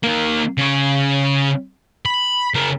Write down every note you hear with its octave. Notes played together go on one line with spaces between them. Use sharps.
D#3 A#3
C#3 C#5
B5
C#3 A#4